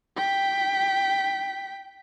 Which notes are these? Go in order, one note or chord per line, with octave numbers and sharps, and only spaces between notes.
G5 B6